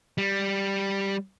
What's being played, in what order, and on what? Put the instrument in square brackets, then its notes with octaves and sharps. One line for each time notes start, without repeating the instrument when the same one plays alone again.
[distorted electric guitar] G3